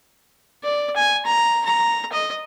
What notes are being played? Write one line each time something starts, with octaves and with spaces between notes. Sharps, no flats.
D5
G#5
A#5
A#5
D#5